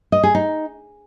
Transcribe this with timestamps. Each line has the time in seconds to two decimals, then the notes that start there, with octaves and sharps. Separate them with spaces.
0.12 D#5
0.23 G#4
0.35 D#4